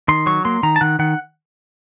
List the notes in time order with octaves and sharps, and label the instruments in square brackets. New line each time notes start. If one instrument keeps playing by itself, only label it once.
[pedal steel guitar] D#3 C6
F#3 C#6
A#3 C6
D#3 A#5
A5
D#3 F#5
D#3 F#5